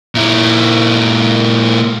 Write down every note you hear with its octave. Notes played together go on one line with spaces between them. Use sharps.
A#2 E4